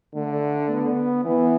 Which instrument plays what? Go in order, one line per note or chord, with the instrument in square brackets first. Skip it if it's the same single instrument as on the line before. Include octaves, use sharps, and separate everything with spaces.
[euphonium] D3 [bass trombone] A3
[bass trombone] B3
[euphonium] E3 [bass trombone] B3